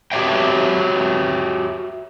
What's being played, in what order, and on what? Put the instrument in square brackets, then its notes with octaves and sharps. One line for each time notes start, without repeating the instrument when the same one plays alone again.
[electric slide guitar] F#4 G4 C#5 E5 G5